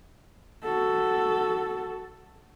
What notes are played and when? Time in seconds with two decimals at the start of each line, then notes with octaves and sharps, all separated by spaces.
0.64 F#4 A4